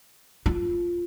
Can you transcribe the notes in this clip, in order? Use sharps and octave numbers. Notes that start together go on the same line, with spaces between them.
F4